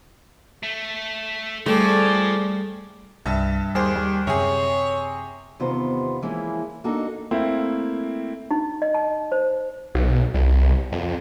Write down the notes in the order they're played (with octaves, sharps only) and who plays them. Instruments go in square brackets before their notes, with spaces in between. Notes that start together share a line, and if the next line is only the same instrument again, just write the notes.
[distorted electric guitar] A3
[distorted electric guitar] F3 [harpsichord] G3 C4 A4 [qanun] A3 [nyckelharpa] G#4 D5
[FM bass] C2 [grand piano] G2 E5 A5
[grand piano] D#2 G#4 C5 [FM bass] G3
[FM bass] G3
[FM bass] F#2 [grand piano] C3 G#4 [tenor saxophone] C#5
[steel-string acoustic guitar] E2 C3 D#3 B3 F4 C5
E3 F3 G#3 A#3 C#4 E4
A#3 D4 D#4 F#4 A4
[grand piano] A3 A#3 C4 E4
[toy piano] D#4
D#5
A5
C5
[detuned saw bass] B1
C2
F2